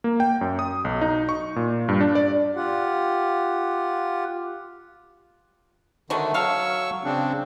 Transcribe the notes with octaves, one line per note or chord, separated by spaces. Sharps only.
A#3
G5
F#2
D#6
B1
D#4
C#6
A#2
G2
D4
D5
F4 G4 F#5
D3 D#3 F#3 G#3 A3
F#3 A4 F5 C#6 E6
C#3 C4 D4